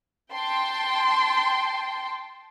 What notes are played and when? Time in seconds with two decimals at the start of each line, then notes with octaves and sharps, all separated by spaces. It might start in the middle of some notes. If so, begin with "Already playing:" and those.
0.33 G5 A5 C6